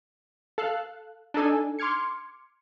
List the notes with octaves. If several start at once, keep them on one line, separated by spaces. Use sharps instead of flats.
A4 F5 F#6
D4 D#4 A4 G#5
C6 D6 F6 G#6 C#7